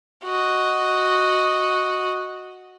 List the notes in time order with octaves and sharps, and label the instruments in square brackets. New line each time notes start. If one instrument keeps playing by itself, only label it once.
[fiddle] F#4 D#5